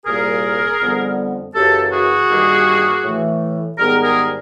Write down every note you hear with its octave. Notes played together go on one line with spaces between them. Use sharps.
C2 A#2 G3 A#3 G#4 A#4
F2 D3 G3 B3
F#2 C#3 E3 G4 A4
F#4 G#4
G2 D#3 G3 A#3
A2 E3 A3
G#2 D#3 G3 B3 G#4 A#4
G#4 A#4